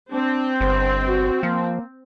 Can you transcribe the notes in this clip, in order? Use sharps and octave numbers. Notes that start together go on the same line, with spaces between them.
C4 D4
G1 C5
F#4
F3 A#3